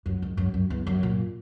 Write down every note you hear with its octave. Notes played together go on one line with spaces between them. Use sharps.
F#2
G#2
F#2
F#2
E2
F#2
A#2